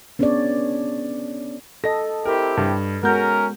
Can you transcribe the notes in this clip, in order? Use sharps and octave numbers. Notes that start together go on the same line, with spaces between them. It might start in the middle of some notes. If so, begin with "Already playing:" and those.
B3 C#4 D4 G#4 C#5 D5
A4 D#5 A#6
C4 E4 G4 A#4
G2
G#3 B3 C#4 F#4 A#4 G6